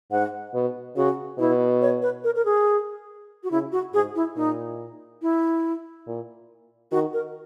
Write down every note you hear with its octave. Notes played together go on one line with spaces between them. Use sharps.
G#2 F#5
B2
C#3 F#4
B2 E4
C#5
B4
A#4
A#4
G#4
F#4
C#3 E4
F#4
G#2 G#4
E4
A#2 D#4
E4
A#2
D#3 F#4
A#4